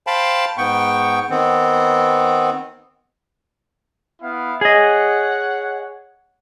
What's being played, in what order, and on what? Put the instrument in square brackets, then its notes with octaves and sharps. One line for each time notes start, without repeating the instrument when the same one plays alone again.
[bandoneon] C5 F5 G5 A5 B5
G#2 B3 G5 C#6
D#3 B3 C4
[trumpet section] B3 E4 F5
[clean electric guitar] G#4 D#5 [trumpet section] C#5 F#5